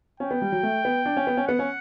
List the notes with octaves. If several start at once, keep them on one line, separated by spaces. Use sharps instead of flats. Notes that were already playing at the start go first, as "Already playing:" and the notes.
C#4 G5
B3
G3
F#3
A3
B3
D4
C#4
B3
C#4
B3 F#5
C#4